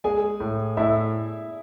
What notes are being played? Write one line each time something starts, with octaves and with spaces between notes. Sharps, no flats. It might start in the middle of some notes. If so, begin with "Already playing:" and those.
G#3 G#4 G#5
A2
A2 E4 E5